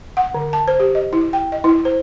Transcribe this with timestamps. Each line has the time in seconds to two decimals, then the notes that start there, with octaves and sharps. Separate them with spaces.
0.17 F#5
0.34 D3
0.53 A5
0.68 C5
0.80 G4
0.95 D#5
1.13 E4
1.33 G5
1.52 D#5
1.64 E4
1.85 C5